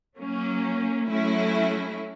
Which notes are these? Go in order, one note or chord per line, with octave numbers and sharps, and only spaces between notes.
F#3 A#3 C#4
F#3 A3 C#4 E4